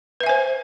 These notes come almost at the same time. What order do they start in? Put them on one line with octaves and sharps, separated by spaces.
B4 E5 G#5 C5